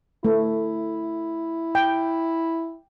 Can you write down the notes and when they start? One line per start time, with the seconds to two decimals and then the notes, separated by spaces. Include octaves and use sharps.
0.25 A3 E4
1.75 G5